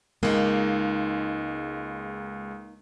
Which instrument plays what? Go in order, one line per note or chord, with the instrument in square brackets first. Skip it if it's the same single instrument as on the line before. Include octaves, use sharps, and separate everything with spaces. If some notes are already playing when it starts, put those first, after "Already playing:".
[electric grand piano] C#2 G#3 [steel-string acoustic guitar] A#3 D#4